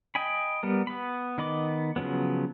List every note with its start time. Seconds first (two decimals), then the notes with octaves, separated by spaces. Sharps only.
0.15 D#5 G5 G#5 B5
0.63 G3 B3 A#4
0.87 B3 B5
1.38 D#3 B3 D#5 B5 D6
1.96 C#3 F3 F#3 B3